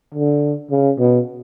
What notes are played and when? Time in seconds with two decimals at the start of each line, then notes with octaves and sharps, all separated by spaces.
0.15 D3
0.71 C#3
0.99 B2